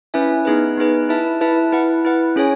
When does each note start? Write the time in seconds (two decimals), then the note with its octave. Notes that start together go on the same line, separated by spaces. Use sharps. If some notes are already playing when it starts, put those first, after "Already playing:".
0.14 C#4 E4 B4 E5 G#5
0.45 B3 D#4 G#4 B4
0.77 B3 D#4 G#4 B4
1.09 E4 B4 E5 A5
1.41 E4 B4 E5 A5
1.72 E4 B4 F#5
2.05 E4 B4 F#5
2.36 C#4 G#4 C#5 G#5